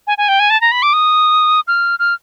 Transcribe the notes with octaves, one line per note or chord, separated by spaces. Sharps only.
G#5
G#5
G5
G#5
A5
A#5
B5
D6
D#6
F6
F6